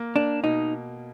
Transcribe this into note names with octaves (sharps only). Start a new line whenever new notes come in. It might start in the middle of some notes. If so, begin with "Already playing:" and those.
Already playing: A#3
A#3 D4
B2 D#4